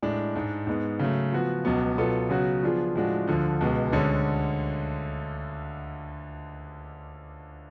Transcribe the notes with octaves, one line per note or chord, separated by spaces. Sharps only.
A2 G#3 D4
G#2 G#3 D4
G#2 G#3 B3
C#3 F#3 A3
F3 B3 F#4
C#2 B2 F#3 B3
B2 F#3 B3 F4 A4
C#3 F#3 B3 F#4
F3 B3 D4 F4 G#4
A2 F3 G#3 D4 F#4
D2 D3 F3
C#2 B2 G#3
D2 D3 G#3 C#4